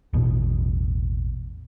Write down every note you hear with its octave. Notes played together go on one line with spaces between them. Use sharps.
A1 E2 B2